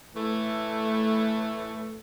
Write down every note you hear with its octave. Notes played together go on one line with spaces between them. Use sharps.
A2 E3 A3